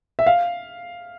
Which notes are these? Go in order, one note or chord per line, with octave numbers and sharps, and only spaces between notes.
E5
F5